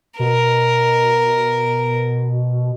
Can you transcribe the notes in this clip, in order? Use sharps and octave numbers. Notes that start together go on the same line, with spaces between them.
B2 A#4